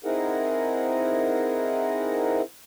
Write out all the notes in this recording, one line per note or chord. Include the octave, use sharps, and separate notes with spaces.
C4 D#4 E4 G#4 A#4 F#5